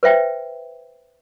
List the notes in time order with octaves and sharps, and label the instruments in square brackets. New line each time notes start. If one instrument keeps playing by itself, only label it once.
[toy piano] B4 C5 E5 G5